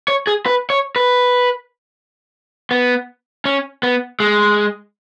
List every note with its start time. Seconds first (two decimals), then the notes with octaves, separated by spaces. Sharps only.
0.08 C#5
0.27 G#4
0.46 B4
0.70 C#5
0.96 B4
2.71 B3
3.45 C#4
3.83 B3
4.20 G#3